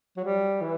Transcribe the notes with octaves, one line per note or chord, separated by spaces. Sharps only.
F#3
G3
E3